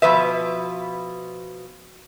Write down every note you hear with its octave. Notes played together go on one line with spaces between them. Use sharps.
B2 F3 B4 E5